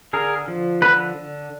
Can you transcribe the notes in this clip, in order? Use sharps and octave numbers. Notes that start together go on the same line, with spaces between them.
D3 G#4 A#4
F3
D3 B4